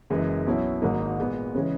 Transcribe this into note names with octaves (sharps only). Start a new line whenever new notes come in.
F#1 F#2 E3 G#3
B1 B2 F#3 C#4 E4
G#1 G#2 F#3 A#3 D#4
A#2 G#3 B3
C#3 E3 G#3 C#4